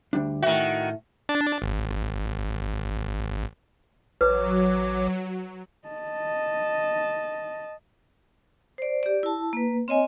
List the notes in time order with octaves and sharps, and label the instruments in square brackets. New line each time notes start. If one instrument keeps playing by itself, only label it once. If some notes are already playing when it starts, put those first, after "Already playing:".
[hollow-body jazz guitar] D2 G3 D4
[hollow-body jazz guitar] A2 E5 [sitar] D#3 F#4
[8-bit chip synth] D4 A6
G#1
[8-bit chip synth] A1 C#5 D6 [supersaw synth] F#3 [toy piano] B4
[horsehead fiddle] D#5 A5
[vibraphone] C5 D5
G4 D5
E4 A5
A#3 B4
C4 C#5 D#5 G#5